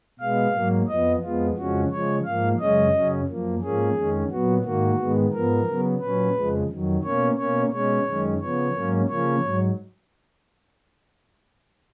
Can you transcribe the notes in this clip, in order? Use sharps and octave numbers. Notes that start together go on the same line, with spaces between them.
B2 G#3 B3 F5
G#2 F#3 A#3
F2 F3 B3 D#5
F2 F3 G#3 B3 F4
F2 C#3 F3 G#3 C#4 F#4
C#3 F3 G#3 C#5
G#2 F3 A#3 F5
F#2 C#3 G#3 C#4 D#5
F#2 C#3 F#3 C#4
F#2 F3 A#3
G#2 F3 A#3 C#4 G#4
F2 D#3 G#3 C#4
A#2 F#3 B3 F#4
G#2 D#3 A#3 F#4
G#2 D#3 G#3 B3
G#2 F3 B3 A#4
C#3 F#3 B3
A#2 F#3 C#4 B4
F2 C#3 F3 G#3
F2 D#3 F#3
B2 A#3 C#4 C#5
B2 A#3 C#4 C#5
B2 G#3 C#4 C#5
F#2 D#3 G#3 C#4
C#3 F3 B3 C#5
G#2 F#3 A#3 C#4
C#3 F3 A#3 C#4 C#5
G#2 F#3